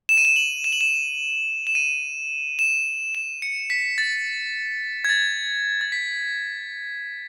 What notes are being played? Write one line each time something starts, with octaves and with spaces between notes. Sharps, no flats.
E7
D#7
E7
F#7
E7
F#7
E7
E7
D#7
E7
E7
C#7
B6
A6
G#6
A6
A6
B6